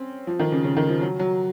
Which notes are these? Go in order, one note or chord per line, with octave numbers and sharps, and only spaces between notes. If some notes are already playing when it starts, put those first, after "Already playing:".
Already playing: C4 C#4
F3
D#3
C#3
C#3
D#3
F3
F#3
F#3